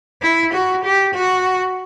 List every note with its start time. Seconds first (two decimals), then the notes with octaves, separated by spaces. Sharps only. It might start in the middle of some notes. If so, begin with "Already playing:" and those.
0.22 E4
0.54 F#4
0.84 G4
1.14 F#4